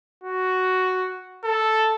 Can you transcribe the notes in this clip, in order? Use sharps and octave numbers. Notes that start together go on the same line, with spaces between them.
F#4
A4